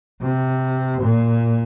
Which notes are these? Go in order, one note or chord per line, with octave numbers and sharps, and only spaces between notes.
C3
A#2